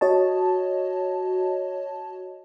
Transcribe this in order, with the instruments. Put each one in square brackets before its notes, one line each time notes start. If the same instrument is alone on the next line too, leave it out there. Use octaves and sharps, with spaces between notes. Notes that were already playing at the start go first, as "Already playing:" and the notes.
[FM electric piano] F#4 C#5 D#5 A5